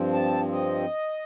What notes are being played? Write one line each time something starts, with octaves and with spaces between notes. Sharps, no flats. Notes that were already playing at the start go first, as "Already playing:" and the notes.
Already playing: G2 F3 C4
A5
D#5